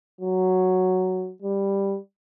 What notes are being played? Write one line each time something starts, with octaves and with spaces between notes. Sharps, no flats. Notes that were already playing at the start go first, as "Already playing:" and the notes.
F#3
G3